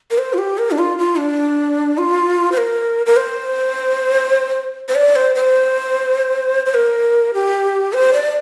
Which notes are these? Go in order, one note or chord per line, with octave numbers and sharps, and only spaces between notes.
A#4
C5
F4
G4
A#4
D4
F4
F4
D4
F4
C5
A#4
A#4
C5
C5
D5
C5
C5
C5
A#4
G4
C5
D5